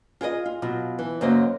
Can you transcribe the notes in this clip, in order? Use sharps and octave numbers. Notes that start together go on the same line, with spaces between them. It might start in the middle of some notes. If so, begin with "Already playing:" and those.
F4 G#4 A#4 D#5
F4
B2 F#3 F4
E3
F#2 C#3 F#3 A#3 C5 D#5